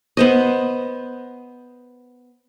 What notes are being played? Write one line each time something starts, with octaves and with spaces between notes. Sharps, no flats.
B3 C5 D#5